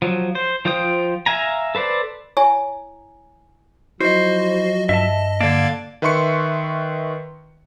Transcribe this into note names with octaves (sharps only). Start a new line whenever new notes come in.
F3 F#3
C5
F3 F4 C5 G5 D#6
E5 F5 G#5 A#5
A4 B4 C5 D5
E4 C#5 G#5 A#5
F3 F#3 E4 F#4 C5 D#5
G2 D#5 E5 A5
D3 A#3 D4 D5 F5 G#6 A6
D#3 B4 E5 C6 C#6 C#7